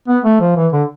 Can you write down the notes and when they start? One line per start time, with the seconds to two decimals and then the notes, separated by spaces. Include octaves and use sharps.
0.08 B3
0.25 A3
0.41 F3
0.56 E3
0.73 D3